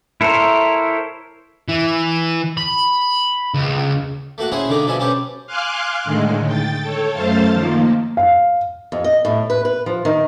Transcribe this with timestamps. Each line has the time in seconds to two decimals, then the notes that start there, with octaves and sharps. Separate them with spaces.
0.21 E4 A4 A#4 C5 C#5
1.69 E3
2.57 B5
3.54 C#2
4.38 A3 A#3 F#4 F#5
4.52 C#4 E4 G#4 C5 C#5
4.69 D3 D#3 A3 A#3 D4
4.86 B2 F3 G3 E5 G#5
5.00 C4 C#4 G4 A4 B4
5.47 F5 G#5 C6 D6 F6 F#6
6.04 A2 D3 D#3 G#3
6.44 G5 A6
6.81 A4 C#5
7.12 F#2 A3 C5 F5 A5 A6
7.52 D#3 F3 A#3
8.17 F5
8.92 F2
9.04 D#5
9.25 A2
9.50 B4
9.65 B4
9.86 F3
10.05 D#3